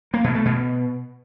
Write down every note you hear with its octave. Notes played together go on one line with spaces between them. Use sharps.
A#3
B2
A3
B2